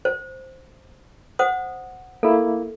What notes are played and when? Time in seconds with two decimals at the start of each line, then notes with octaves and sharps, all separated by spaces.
0.05 C5
1.39 C5 F#5 D#6
2.23 A#3 E4 A4